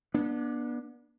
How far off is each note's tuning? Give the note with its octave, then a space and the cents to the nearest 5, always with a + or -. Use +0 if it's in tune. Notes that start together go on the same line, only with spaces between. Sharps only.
B3 -35 D4 +10